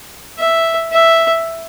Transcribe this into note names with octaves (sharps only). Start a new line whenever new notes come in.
E5
E5